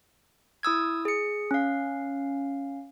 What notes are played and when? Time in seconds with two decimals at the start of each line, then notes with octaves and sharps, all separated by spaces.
0.63 E4 D#6 E6 G#6
1.05 G#4 C#7
1.51 C#4 F5